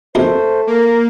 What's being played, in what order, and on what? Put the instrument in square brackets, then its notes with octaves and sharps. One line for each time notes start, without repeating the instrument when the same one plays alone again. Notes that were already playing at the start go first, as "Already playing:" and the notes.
[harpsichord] A#1 F2 C3 [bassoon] A3 [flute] C5
[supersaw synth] A#3 [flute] A#4